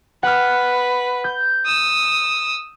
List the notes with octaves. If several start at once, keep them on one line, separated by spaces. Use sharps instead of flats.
B4 F#5 F6
G6
D#6 E6